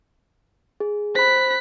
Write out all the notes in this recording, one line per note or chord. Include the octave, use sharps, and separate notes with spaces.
G#4
C5 B5 F#6 B6